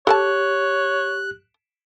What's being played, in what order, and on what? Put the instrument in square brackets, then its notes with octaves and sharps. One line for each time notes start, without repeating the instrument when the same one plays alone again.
[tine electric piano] G4 [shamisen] A4 G#5 A5 [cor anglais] C#5 [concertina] F#6